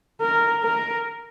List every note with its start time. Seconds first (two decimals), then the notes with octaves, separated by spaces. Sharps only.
0.21 A#4
0.64 A#4